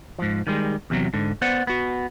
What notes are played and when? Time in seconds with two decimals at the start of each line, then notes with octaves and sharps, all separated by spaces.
0.19 G#2 F3
0.47 D#3 G3 G#3
0.90 E2 C3 F3 F#3
1.14 G#2 D3
1.42 B3 C5 D5 F#5
1.67 B3 F#4